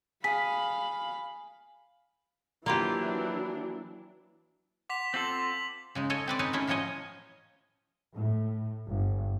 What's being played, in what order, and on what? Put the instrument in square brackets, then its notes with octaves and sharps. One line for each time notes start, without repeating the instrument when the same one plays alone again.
[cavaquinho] G#4 [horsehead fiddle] F5 B5 [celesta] B6
[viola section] E3 F#3 D4 [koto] A#3 F4 G4
[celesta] F#5 [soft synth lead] C6 [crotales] D6 B6 F7
[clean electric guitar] C4 F4 A4 [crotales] F#7
[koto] C#3 G#3 D#4
A4 C#5 D#5 G#5
C4 B4 D5
D#4 B4 C#5 G#5
E3 A3 C#4 E4 A#4
A2 F3 C#4 C#5 D#5 G#5
[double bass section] A2
G1